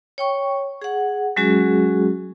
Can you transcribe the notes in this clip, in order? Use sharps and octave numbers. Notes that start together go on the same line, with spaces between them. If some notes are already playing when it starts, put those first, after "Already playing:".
C#5 G5 C#6
G#4 F#5
F#3 G#3 C#4 F#4 G#4